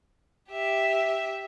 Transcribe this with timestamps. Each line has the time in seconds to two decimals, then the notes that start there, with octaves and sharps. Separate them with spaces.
0.51 G4 E5